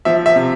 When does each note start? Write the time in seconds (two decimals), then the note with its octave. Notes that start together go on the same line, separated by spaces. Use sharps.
0.05 F3 E5
0.26 E5
0.36 C3